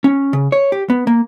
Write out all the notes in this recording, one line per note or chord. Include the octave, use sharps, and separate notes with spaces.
C#4
C#3
C#5
G4
B3
A#3